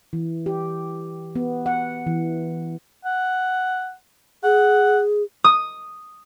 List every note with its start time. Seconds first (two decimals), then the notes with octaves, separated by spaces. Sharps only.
0.13 E3
0.46 G4
1.35 B3
1.66 F#5
2.07 E3
3.05 F#5
4.44 G#4 F#5
5.44 D#6